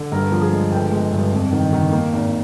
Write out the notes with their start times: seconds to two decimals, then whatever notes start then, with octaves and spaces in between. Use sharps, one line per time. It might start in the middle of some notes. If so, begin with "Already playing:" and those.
Already playing: D3
0.12 G2 A#4
0.32 F3
0.41 G#4
0.52 G#3
0.72 G1 G5
0.92 G#3
1.12 G2
1.33 F2
1.53 D#3
1.73 D#3
1.92 A#3
2.13 G#1